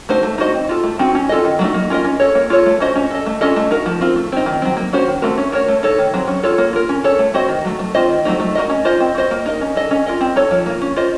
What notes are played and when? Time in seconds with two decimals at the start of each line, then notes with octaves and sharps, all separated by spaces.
0.09 A3 D#4 F#4 C5
0.23 A3
0.38 D#4 F#4 C5 D#5
0.54 C4
0.69 F4 A4
0.83 A3
0.99 C4 D#4 F#4
1.15 C#4
1.29 F4 A4 D#5
1.44 D#3
1.59 F#3 A3 D#4
1.74 A#3
1.90 C#4 F4 A#4 D#5
2.04 C#4
2.20 A4 C#5
2.35 A#3
2.50 F4 A4 C#5
2.66 A3
2.80 C#4 F#4 C5 D#5
2.96 C#4
3.11 A4 D#5
3.26 A3
3.41 C#4 F4 A4 D#5
3.56 A3
3.71 D#4 F#4 A#4
3.86 F3
4.01 C4 F4
4.16 A3
4.32 C4 D#4
4.46 D#3
4.62 F#3 C4
4.77 A#3
4.93 C#4 F#4 C5
5.08 D#3
5.22 A3 C4 F#4 A#4
5.38 C#4
5.52 F#4 A#4 C#5
5.68 A3
5.83 D#4 A4 C#5
5.98 D#3
6.14 F#3 C4
6.28 C#4
6.43 F4 A4 C#5
6.58 A#3
6.73 F4 A#4
6.89 C#4
7.04 A4 C#5
7.19 A3
7.34 C4 F#4 C5 D#5
7.49 D#3
7.65 F#3 A3
7.79 A3
7.95 C4 F4 C5 D#5
8.10 D#3
8.25 F#3 A3 C4 D#4
8.40 A3
8.55 D#4 F#4 A#4 D#5
8.70 C#4
8.85 F4 C5 D#5
9.00 C4
9.15 F#4 C5 D#5
9.31 A#3
9.46 D#4 A#4 D#5
9.61 C#4
9.76 A4 D#5
9.91 C#4
10.06 F4 A#4 D#5
10.21 C4
10.36 D#4 A4 C#5
10.51 F3
10.66 A#3 F4
10.82 C#4
10.96 F4 C5 D#5